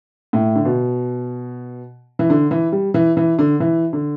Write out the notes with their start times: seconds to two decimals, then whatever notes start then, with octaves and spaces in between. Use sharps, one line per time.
0.33 A2
0.56 D3
0.65 B2
2.19 E3
2.30 D3
2.51 E3
2.72 G3
2.94 E3
3.17 E3
3.39 D3
3.60 E3
3.93 D3